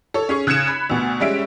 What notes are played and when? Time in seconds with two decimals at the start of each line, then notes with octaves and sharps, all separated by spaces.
0.14 A4 C#5
0.29 C#4 G#4 C#6
0.47 C#3 F#6 G#6 C#7 E7
0.68 B5
0.90 D2 B2
1.20 G3 G#3 C#4 E5 D7